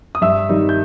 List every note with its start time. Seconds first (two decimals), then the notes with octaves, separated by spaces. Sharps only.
0.15 D#6
0.21 G2 E5 E6
0.49 D#3 G3 D#4
0.69 G6